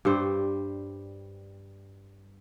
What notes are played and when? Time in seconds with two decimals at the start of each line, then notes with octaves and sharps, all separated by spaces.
0.05 G2 G3 C5